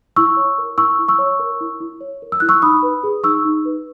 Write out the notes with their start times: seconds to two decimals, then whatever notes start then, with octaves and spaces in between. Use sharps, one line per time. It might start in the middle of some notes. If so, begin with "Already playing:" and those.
0.16 E4 C#6 E6
0.37 C#5
0.58 A#4
0.78 E4 C#6 E6
0.99 E4
1.08 C#6 E6
1.19 C#5
1.40 A#4
1.61 E4
1.80 E4
2.01 C#5
2.22 A#4
2.32 E6
2.40 E4 F#6
2.49 C#6 E6
2.62 D#4 B5 D#6
2.83 B4
3.03 G#4
3.24 D#4 C#6 E6
3.45 D#4
3.65 B4